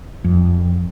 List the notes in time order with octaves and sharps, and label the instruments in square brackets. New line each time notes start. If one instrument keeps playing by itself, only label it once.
[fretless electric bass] F2